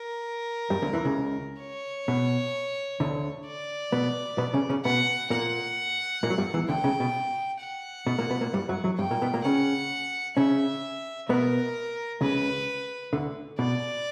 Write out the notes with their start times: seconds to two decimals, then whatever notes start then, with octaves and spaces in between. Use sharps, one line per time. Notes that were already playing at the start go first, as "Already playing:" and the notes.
Already playing: A#4
0.70 G2 G3
0.82 D2 D3
0.93 E2 E3
1.05 C#2 C#3
1.62 C#5
2.08 B2
3.00 D2 D3
3.46 D5
3.92 B2 B3
4.38 B2 B3
4.54 C#3 C#4
4.69 C#3 C#4
4.85 B2 B3 F#5
5.30 A#2 A#3 F#5
6.23 A#2 A#3
6.30 F#3
6.38 G2 G3
6.54 E2 E3
6.68 D2 D3 G5
6.84 C#2 C#3
7.00 B2
7.62 F#5
8.07 B2
8.19 A#2 A#3
8.30 B2 B3
8.41 A#2 A#3
8.53 G2 G3
8.69 F#2 F#3
8.84 F#2 F#3
8.98 G2 G3 G5
9.11 A#2 A#3
9.22 B2 B3
9.34 A#2 A#3
9.45 C#3 C#4 F#5
10.37 C#3 C#4 E5
11.29 B2 B3 A#4
12.21 C#2 C#3 B4
13.13 D2 D3
13.59 B2 D5